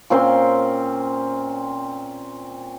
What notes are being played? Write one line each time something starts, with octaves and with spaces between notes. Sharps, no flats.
A#2 C4 C#4 C6